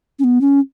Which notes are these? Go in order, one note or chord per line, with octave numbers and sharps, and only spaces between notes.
C#4
B3
C#4